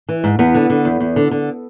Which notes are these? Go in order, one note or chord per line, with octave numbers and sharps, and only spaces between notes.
E3
G#2
E2 B3
D3
D3
E2
E2
D3
D3